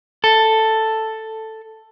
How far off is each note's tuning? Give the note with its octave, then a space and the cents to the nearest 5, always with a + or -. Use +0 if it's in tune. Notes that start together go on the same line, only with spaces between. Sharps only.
A4 +5